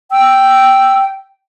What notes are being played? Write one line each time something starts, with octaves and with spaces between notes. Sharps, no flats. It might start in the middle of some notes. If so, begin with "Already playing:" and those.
G5 E6